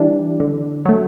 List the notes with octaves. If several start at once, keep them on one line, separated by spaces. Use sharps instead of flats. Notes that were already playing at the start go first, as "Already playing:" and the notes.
Already playing: E3 G3 D4
D3
F#3 A3